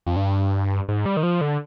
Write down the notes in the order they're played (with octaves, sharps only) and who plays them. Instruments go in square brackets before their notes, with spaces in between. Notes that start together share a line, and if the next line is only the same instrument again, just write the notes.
[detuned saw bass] F2
G2
G#2
G3
D#3
F3
D3